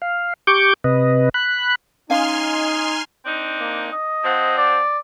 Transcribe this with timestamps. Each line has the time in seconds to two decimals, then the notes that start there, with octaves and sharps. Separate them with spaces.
0.02 F5
0.47 G4 C#6 D6 G6
0.84 C3 B4 D#5
1.34 B5 F#6
2.10 C#4 D#4 F5 G#5 C6 F6
3.25 C4 D4 D#4
3.60 A#3
3.92 D#5
4.24 F3 C4 F#5
4.58 D5